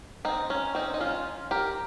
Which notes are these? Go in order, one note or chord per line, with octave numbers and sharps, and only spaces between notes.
C4 D#4
C#4
C4 D#4
D#4
C#4 F4
G4 A#4